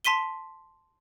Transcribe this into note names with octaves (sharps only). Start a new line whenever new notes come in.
A5 C6 B6 D#7 G7